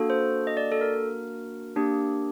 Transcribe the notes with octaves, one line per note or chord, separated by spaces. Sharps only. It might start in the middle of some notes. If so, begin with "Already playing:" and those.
Already playing: A#3 D4 F#4 A4
C5
D#5
D5
A4
A#4
A#3 D4 G4